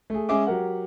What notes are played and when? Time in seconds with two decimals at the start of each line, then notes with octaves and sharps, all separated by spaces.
0.10 A3 G#4
0.29 G#3 C#4 G#4 E5 D6
0.47 F#3 G4 A#4 F#5